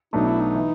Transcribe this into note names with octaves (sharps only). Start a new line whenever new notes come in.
B1 B2 F#3 A3 D4 D#4
E4
D#4
E3